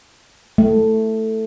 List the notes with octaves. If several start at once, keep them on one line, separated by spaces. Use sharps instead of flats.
A3